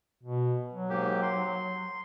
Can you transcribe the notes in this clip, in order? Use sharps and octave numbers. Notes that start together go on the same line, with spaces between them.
B2
F#3
G#2 A#3 G4
C6